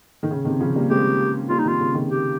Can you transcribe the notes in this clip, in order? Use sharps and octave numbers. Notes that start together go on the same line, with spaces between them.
D#3
C#3
C3 D#3
C#3 F3
G3 A#3
G#3 C4 G4
G3 A#3 F4
D#4
C3 D#3 F4
C#3
C3 D#3
G4